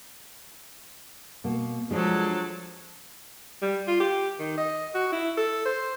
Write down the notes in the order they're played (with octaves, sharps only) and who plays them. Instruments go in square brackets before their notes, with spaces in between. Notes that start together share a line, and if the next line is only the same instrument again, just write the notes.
[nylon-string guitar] B2 A#3
[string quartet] F3 F#3 A4 [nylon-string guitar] G#3 D4
[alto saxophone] G3
F4
G4
D#3
D#5
F#4
E4
A4
C5